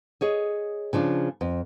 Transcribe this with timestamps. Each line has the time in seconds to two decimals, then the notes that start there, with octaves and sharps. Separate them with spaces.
0.21 G#4 C#5 D#5
0.93 C#3 F3 D4 F4
1.41 F2